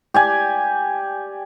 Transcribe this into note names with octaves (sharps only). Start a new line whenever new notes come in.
G4 D5 G#5